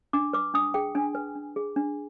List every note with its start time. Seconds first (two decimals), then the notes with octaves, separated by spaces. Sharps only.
0.13 D4 D6
0.33 B4 D6
0.54 D4 D#6
0.74 G#4 G5
0.95 D4 G#5
1.15 B4
1.35 D4
1.56 G#4
1.76 D4